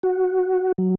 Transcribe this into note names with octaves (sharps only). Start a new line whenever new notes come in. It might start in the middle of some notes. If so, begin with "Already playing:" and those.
F#4
F#3